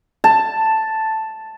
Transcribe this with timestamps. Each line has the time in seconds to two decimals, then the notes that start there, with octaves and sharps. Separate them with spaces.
0.24 A5